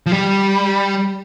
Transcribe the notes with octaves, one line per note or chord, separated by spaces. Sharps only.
F3
G3